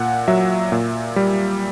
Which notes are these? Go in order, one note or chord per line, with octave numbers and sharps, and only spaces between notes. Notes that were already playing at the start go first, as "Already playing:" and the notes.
Already playing: A#2 F#5
F#3 E5
A#2
G3